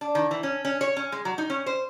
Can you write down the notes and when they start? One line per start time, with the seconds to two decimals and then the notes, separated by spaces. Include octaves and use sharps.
0.01 D4
0.15 D#3
0.31 E3
0.43 C#4
0.65 C#4
0.81 C#5
0.96 C#4
1.12 G#3
1.25 F#3
1.38 D#4
1.50 C#4
1.66 C5